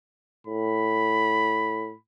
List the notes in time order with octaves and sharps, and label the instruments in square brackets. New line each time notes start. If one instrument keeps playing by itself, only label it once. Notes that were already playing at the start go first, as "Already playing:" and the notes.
[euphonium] A2 [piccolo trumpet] B5